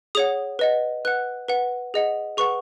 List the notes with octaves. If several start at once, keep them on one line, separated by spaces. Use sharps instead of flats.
G#4 C#5 F#5 D#6
B4 D#5 F#5
B4 F#5 F#6
B4 F#5
G#4 D#5 F#5
G#4 B4 F#5 C#6